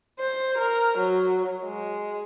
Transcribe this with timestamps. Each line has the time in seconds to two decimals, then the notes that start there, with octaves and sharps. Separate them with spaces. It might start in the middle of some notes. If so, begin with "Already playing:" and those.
0.20 C5
0.58 A#4
0.98 F#3
1.64 G#3